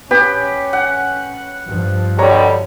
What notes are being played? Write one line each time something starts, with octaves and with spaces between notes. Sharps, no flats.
B3 C#4 G4
F#5
G2 F3
B2 D3 G3 C#5 A#5 C#6